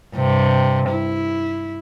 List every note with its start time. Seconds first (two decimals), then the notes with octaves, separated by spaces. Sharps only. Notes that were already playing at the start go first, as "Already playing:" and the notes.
0.16 G2 C3
0.90 E4